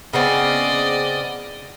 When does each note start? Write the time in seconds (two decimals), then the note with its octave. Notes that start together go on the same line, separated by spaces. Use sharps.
0.13 C#3 B3 C4 D5 D#5